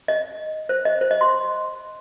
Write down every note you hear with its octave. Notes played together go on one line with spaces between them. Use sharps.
D#5
C5
D#5
C5
D#5
C6